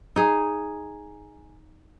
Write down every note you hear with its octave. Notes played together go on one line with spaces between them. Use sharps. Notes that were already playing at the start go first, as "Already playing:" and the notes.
D#4 G#4